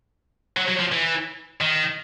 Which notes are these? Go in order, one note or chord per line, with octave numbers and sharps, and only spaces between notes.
F#3
F#3
F3
E3
D#3